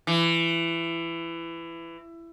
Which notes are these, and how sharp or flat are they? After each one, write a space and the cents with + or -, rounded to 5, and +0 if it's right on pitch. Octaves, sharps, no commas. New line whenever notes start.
E3 +20